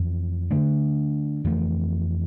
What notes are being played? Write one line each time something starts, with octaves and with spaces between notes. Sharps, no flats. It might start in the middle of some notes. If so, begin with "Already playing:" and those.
Already playing: F2 E3 A3
D3 A3 D4
F2 E3 A3